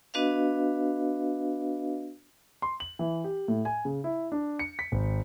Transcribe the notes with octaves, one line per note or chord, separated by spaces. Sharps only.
B3 D4 F#4 B4 D#5 F5
C6
F#7
E3
G4
A2
G#5
C#3
E4
D4
C#7
B6
G#1